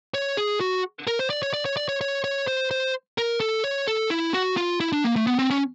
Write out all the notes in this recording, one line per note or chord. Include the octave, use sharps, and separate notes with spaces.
C#5
G#4
F#4
A#4
C5
D5
C#5
D5
C#5
D5
C#5
C#5
C#5
C5
C5
A#4
A4
C#5
A4
E4
F#4
F4
E4
D4
A#3
A3
B3
C4
C#4